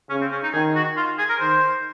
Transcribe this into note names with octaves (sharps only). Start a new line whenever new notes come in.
C#3 C#4
C4
C#4
D#4
D#3 G#4
F#4
F4
G#4
A#4
D#3 C5